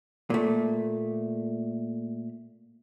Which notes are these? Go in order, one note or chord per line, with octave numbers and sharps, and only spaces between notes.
A#2 A3